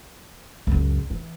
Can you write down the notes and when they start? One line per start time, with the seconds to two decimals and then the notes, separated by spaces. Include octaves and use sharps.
0.67 C#2 F#2
1.10 E3